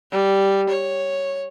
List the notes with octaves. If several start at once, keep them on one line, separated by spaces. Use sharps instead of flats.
G3
C#5